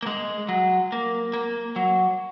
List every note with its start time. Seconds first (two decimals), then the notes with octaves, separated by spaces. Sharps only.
0.03 A#3
0.07 G#3
0.49 F#3
0.92 A#3
1.33 A#3
1.76 F#3